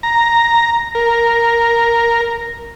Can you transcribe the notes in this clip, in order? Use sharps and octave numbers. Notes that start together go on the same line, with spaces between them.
A#5
A#4